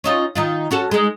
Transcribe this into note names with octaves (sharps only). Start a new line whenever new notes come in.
C#4 D#4 F4
D#3 D#4 F4
C#4 F#4 A4
G#3 D#4